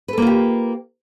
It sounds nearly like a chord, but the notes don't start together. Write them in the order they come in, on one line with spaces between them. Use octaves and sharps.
B4 A4 A#3 F4 G4